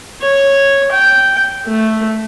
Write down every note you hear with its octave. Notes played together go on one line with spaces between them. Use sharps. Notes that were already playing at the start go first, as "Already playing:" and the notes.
C#5
G5
A3